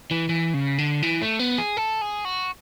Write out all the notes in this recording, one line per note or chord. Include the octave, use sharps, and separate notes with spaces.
E3
E3
C#3
D3
E3
A3
B3
G#4
A4
G#4
F#4